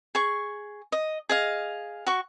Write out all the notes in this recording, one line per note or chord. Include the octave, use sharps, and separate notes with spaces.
G#4 C#6
D#5
G#4 D#5 F5
F#4 C#6